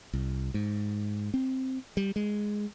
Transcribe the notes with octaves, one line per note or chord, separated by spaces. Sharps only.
C2
G#2
C4
G3
G#3